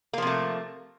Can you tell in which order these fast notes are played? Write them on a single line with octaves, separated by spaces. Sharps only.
A#3 F3 C3 A3